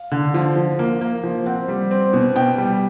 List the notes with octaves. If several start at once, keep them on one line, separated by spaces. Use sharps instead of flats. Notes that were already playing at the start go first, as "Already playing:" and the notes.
Already playing: F5
D3
F3
F3
A#3
A#3
F3
C4 F#5
G3
C4
B2
B2 G5
G3